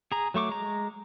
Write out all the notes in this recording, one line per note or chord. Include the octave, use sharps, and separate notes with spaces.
G#4 A#5
F#3 A3 C#6 D6
G#3 A#5